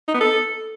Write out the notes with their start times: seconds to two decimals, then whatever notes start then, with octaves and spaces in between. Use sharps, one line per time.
0.08 D#4
0.14 B3
0.21 A4